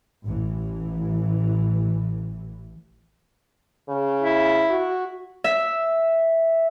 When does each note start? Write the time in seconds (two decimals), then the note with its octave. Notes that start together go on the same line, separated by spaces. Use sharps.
0.24 A1 E3
3.89 C#3
4.21 E4
4.70 F#4
5.44 E5